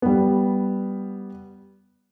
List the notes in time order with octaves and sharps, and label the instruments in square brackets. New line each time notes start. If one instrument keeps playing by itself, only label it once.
[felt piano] G3 B3